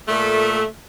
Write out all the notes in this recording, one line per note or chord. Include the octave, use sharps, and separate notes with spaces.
A#2 A3